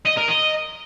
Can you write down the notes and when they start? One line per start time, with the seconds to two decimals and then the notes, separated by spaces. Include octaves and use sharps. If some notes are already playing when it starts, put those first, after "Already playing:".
0.05 D#5
0.17 A#4
0.28 D#5